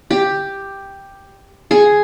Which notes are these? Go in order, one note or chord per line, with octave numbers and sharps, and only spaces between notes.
G4
G#4